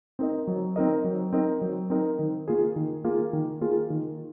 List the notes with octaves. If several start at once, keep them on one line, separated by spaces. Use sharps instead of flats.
C4 D#4 A#4 D#5
F#3
C4 D#4 A#4 D#5
F#3
C4 D#4 A#4 D#5
F#3
C4 D#4 A#4 D#5
D#3
A#3 F4 G#4
D#3
A#3 F4 G#4
D#3
A#3 F4 G#4
D#3